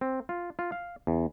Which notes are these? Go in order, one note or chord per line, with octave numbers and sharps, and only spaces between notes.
C4
F4
F4
F5
E2